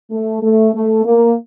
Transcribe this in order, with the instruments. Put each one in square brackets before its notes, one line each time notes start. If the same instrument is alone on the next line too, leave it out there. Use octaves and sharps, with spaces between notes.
[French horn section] A3
A3
A3
A#3